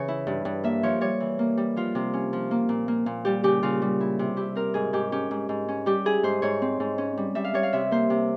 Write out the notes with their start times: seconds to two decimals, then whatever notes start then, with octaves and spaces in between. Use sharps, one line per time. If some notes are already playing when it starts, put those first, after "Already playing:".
Already playing: C#3 E3 C#5
0.08 E4
0.27 G2
0.45 G2
0.64 A#3 E5
0.83 F3 C#5
1.01 G3 C#5
1.20 E3
1.39 A#3
1.57 G3
1.76 F3 F4
1.95 C3
2.14 C#4
2.33 F3
2.51 A#3
2.69 A#2
2.88 A#3
3.06 A#2
3.25 G3 G4
3.43 C#3 G4
3.63 C#3 F4
3.82 G3
4.01 E4
4.19 C3
4.37 E4 G4
4.55 C4 A#4
4.74 G#2 G#4
4.93 G#2 G4
5.12 C#4 G4
5.31 G#2
5.49 G#2
5.68 C#4
5.86 G3 G4
6.05 E4 G#4
6.23 G#2 C5
6.42 G#2 C#5
6.62 C4
6.80 G#2
6.98 C#4
7.17 G3
7.35 G3 E5
7.45 F5
7.54 G3 C#5
7.63 F5
7.73 C3 E5
7.91 A#3 C5
8.10 C3